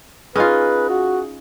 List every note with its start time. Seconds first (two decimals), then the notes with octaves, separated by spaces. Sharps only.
0.36 C#4 D#4 F4 G#4 B4
0.90 F#4